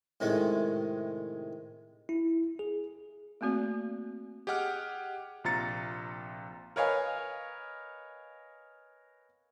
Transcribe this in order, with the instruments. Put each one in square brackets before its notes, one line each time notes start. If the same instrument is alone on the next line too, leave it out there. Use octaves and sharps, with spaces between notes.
[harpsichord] A2 C3 D#3 G#3
[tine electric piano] E4
G#4
[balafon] A3 A#3 C4 F#4 D5
[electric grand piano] G4 G#4 D#5 F#5 D6 F6
A#1 C3 F4 A#5 A6 C#7
[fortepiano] A#4 B4 C#5 D#5 F5 G#5